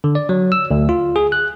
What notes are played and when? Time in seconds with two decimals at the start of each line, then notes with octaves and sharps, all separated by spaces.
0.04 D3
0.15 D5
0.29 F#3
0.52 E6
0.71 D2
0.89 F4
1.16 G#4
1.32 F#6